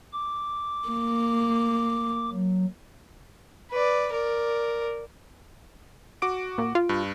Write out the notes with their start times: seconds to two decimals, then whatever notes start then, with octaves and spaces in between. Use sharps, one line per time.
0.13 D6
0.88 A#3
2.32 F#3
3.71 B4 D5
4.12 A#4 D5
6.22 F#4 D6 D7
6.58 A#2
6.75 F4
6.89 G2